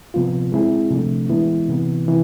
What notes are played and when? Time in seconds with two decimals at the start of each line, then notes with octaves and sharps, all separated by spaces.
0.14 C3 F3 B3 F4
0.52 G#3 C4 E4 G#4
0.91 C3 F3 A3 D4
1.30 E3 G#3 B3 E4
1.69 C3 E3 B3
2.06 C3 E3